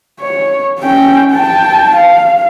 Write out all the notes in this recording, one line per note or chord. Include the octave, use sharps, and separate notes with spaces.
C#5
C#4 G5
G5 A5
F5